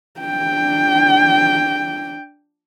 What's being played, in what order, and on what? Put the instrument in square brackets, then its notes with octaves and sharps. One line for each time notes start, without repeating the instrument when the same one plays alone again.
[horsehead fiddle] D4 G5